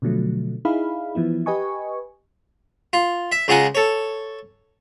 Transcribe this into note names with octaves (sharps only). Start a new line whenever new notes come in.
B2 D3 F3 F#3 A3
D#4 E4 G#4 F5 B5
E3 F3 B3 E4
G4 B4 D#5 G#5 C#6
F4
E5
C#2 G#3 F4 F#5 G#5 A#5
A4 C#5